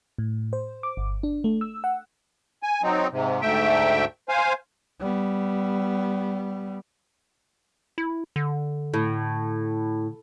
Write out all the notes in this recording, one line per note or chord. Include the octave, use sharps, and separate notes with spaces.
A2
C5
D6
G1
D4
A3
E6
F#5
G#5
F#3 C4 D#4
G#2 C3
D2 G#2 A3 E5 G5
C5 F5 G#5
G3 B3
E4
D3
A2